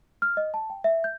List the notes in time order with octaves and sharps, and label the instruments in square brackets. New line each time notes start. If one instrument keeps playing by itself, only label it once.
[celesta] F6
D#5
A5
G5
E5
G6